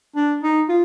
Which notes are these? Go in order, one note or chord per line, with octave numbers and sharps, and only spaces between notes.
D4
D#4
F4